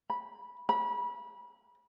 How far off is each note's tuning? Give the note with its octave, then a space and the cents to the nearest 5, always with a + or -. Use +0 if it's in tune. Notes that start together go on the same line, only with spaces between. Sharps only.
B5 -10
B5 -30